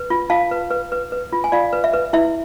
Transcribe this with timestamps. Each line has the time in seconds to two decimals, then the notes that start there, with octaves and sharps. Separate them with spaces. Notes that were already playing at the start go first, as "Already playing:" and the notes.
Already playing: B4
0.10 F4
0.30 F4 F5 A5
0.51 B4
0.71 B4
0.92 B4
1.12 B4
1.32 F4
1.44 G#5
1.52 F4 D5 F5
1.73 B4
1.84 E5
1.94 B4
2.13 E4 E5